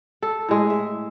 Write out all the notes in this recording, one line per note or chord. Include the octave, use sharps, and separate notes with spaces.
A4
A2 G#3
E5